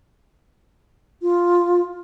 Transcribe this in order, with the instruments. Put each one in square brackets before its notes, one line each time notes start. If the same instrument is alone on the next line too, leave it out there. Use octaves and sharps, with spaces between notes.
[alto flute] F4